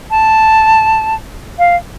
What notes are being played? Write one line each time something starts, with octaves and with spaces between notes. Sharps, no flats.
A5
F5